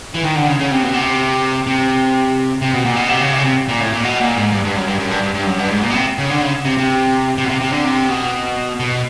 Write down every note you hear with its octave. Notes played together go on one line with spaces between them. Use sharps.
E3
D#3
D3
C#3
C#3
C3
B2
C3
C3
C3
B2
A#2
B2
C3
C#3
C3
C#3
C3
A#2
A2
A#2
B2
A#2
G#2
G2
G2
F#2
G2
F#2
G2
G2
G2
F#2
G2
G#2
A#2
B2
C3
C#3
D3
C#3
C3
C3
C3
B2
C3
C3
D3
C3
B2
B2